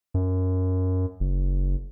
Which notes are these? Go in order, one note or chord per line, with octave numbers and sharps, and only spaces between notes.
F#2
F#1